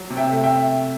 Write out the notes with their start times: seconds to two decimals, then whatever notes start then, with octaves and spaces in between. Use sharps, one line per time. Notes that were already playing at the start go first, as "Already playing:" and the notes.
Already playing: F#3
0.10 C3
0.17 E5 G5
0.31 A3
0.44 E5 G5